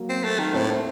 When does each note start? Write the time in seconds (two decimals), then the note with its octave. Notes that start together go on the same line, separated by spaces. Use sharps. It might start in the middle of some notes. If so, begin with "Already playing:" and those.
Already playing: F#3 A#3
0.09 C4
0.24 A3
0.39 D#3
0.54 A2 A3 C4
0.70 A3 C4